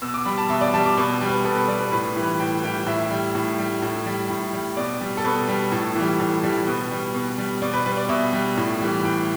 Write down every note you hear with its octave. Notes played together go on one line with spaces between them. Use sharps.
B2 E6
D6
G3 B5
A5
B2 E5
D5
G3 A5
D6
B2 B5
G3
B4
B2 A4
B4
G3 D5
B4
A2 B4
E3 G3
B4
A2 G5
E3 G3 G5
A2 E5
G3
A2
G3
A2
G3
A2
G3
B2 D5
G3
A4
B2 B4
G3
A2 A4
E3
G3
A2
E3 G3
B2 B4
G3
B2
G3
B2 D5
B4
G3 B4
D5
B2 E5
G3
A2
E3 G3
A2 G5